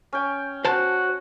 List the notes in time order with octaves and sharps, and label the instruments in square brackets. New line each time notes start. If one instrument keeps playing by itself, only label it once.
[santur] C#4 G5
[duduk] F#4 [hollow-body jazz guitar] C5 A5